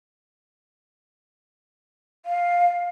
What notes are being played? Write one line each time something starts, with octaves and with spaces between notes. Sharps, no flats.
F5